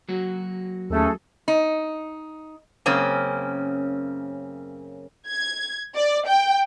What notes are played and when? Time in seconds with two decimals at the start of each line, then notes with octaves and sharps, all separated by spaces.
0.09 F#3 A#3 F#4
0.90 D#2 A3 C#4 G#4 A4
1.48 D#4
2.86 F#2 C#3 A#3 C4 C#4
5.29 G#6
5.96 D5
6.26 G5